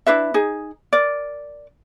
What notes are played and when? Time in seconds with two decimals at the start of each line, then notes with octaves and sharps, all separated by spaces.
0.06 D4 E4 B4 E5
0.34 D#4 G#4
0.93 A#4 D5